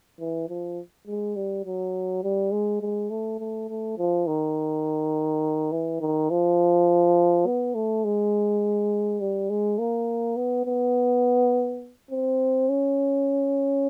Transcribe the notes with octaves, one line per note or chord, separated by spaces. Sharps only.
E3
F3
G#3
G3
F#3
G3
G#3
G#3
A3
A3
A3
F3
D#3
E3
D#3
F3
B3
A3
G#3
G3
G#3
A#3
B3
B3
C4
C#4